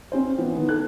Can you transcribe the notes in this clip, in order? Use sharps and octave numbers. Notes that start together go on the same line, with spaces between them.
C4 C#4 C5
E3 B3
D#3 B3
A4 F#6